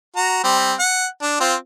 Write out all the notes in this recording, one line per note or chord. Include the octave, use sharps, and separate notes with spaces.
F#4 A#5
G3 C4
F#5
D4
C4 F4